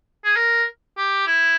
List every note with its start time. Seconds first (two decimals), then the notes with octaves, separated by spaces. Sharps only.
0.25 G#4
0.36 A#4
0.97 G4
1.27 E4